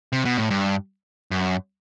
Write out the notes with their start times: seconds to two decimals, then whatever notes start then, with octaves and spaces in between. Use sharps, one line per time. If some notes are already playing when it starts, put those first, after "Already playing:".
0.13 C3
0.25 B2
0.38 A2
0.50 G2
1.31 F#2